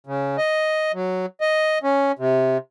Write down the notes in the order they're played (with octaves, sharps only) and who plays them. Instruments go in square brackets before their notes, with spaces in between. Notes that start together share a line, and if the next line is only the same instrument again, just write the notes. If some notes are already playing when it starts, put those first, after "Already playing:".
[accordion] C#3
D#5
F#3
D#5
C#4
C3